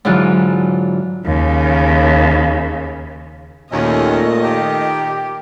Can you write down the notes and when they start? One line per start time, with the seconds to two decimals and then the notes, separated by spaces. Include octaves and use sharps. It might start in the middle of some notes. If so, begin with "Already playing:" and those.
0.05 G#2 D3 E3 F#3 G#3 F4
1.26 D#2 C#3
3.72 D#2 A#2 A3 C#4 D#5
4.43 D#3 G4